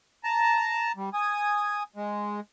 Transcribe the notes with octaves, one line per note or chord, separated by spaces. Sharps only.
A5 A#5
G3
G#5 D#6
G#3